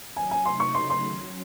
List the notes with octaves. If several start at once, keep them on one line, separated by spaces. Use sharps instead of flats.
D#3 F#3 C#4 G#5
G#5
C3 F#3 A3 D#4 C6
C#6
C#3 F#3 A3 D#4 C6
C6
D#3 F#3 C#4